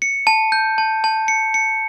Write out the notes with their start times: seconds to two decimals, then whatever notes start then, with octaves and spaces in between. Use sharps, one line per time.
0.02 C#7
0.27 A5
0.52 G6
0.78 A5
1.04 A5
1.28 C#7
1.54 C#7